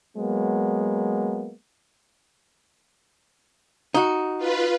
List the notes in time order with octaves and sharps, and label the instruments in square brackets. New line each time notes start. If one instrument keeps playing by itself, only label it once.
[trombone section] F#3 G#3 A#3 B3
[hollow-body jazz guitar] D#4 F#4
[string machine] F4 B4